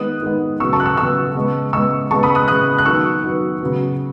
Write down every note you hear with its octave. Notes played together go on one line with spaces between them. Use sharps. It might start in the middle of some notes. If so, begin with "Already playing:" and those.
Already playing: D#3 G#3 B3 D#6 F#6
D#3 G#3 B3
C#3 F#3 B3 C#6 E6
A5 C#6
F#6
C#6 E6
C#3 F#3 B3 C#6 E6
C#3 G#3 B3
C#3 G#3 B3 C#6 E6
C#3 G#3 B3 A5 C#6
B5 D#6
D#6 F#6
C#3 G#3 B3 D#6 F#6
F#6
D#3 F#3 B3 C#6 E6
D#3 F#3 B3
C#3 F#3 B3